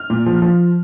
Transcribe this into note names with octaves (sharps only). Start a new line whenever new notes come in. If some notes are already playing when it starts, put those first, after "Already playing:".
Already playing: F6
A#2
F3
F3